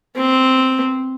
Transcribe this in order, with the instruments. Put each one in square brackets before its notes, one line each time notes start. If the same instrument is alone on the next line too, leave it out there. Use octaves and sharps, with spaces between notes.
[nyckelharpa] C4